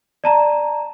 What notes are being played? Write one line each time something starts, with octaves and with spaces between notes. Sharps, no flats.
D5 A5 A#5